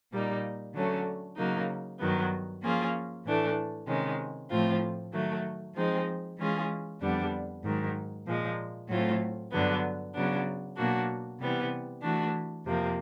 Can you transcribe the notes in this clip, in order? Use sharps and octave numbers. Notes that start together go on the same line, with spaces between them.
A#2 G3 A#3 D#4
D3 F#3 A3 C#4
C#3 F#3 A#3 D#4
G2 D#3 F#3 B3
F3 A#3 C#4 F4 G#4
A2 E3 A3 D4
C3 D#3 G#3 C#4
A2 F3 A3 C4 F4
D#3 F#3 A3
F3 G#3 C4 D#4
E3 G#3 C#4 F4 G#4
F2 D3 G3 B3 D4
G#2 D#3 F#3
A#2 F3 G#3
A2 F#3 A3 C4 F4
G2 D3 F#3 B3
C#3 F#3 B3 D4
B2 F#3 A#3 D4 F#4
C3 E3 G3 B3
E3 A3 D4 F#4
F2 C3 F3 A#3